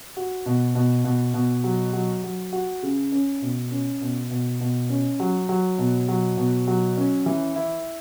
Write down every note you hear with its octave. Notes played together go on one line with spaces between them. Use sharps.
F#4
B2
B2
B2
B2
F#3
F#3
F#3
F#4
C#3
C#4
B2
C#4
B2
B2
B2
C#4
F#3
F#3
B2
F#3
B2
F#3
C#4
E3
E4